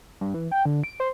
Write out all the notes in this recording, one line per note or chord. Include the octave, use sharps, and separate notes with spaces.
G2
E3
G5
D3
D7
C5